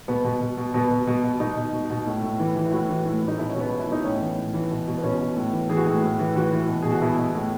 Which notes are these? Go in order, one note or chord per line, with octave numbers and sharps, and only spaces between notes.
B2 B3
B2
B2
B2
B2 B3
B2
B2
B2
B2 D#4
B2
B2
B2
A2
A2
E3
E3
E4
A2 F#4
E3
A2
A2
D#4
B2 E4
C#4
B2
B3
B2
E4
B2 D#4
A2 C#4
E3
A2
E3
B2
B2
B3
B2 C#4
B2
A2
E3
E3 G#4
F#4
A2 G#4
A2
E3
E3 F#4
E3
B2
B2 G#4
F#4
B2 E4
B2
A2